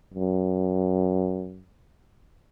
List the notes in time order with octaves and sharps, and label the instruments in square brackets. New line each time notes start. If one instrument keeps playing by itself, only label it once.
[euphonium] F#2